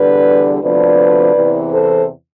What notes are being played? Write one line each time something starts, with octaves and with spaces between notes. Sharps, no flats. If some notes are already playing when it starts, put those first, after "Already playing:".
Already playing: E2 D3 G3 D4 B4 D5
D2 C3 F3 B3 D4 B4 D5
E2 C3 E3
A4 C5